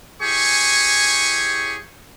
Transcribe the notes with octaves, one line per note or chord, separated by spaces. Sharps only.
E4 G4 G#4 C#5 G#5 C#6